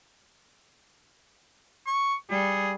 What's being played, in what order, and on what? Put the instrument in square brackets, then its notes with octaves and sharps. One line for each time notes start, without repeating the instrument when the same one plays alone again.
[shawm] C#6
[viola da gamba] G3 [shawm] G#4